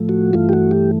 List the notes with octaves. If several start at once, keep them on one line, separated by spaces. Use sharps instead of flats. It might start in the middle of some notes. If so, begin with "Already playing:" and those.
Already playing: A2 F3 A3
F#4
G2 E3 A3 F4
G4
F#4
G4